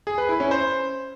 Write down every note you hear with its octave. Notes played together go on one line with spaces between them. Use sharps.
G#4
B4
E4
C#4
C5